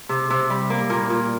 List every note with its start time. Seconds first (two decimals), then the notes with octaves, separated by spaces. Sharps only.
0.09 C3
0.30 C3
0.50 G3
0.70 A#3
0.90 A#2 A#4
1.10 A#2